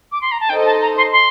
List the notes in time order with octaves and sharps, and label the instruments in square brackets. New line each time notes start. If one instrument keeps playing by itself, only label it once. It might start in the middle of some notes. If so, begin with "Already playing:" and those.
[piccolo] D6
C6
A#5
A5
[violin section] D#4 A4 C5 D#5 [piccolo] G5
[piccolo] A5
A#5
C6
C6